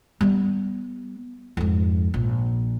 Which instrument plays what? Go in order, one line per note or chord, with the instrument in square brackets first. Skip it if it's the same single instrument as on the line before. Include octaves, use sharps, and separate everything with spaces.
[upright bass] G3 B3
F2 G#2
A#1